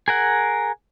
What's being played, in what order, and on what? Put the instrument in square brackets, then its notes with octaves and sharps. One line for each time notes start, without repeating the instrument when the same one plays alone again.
[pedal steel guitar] G#4 A#4 F#5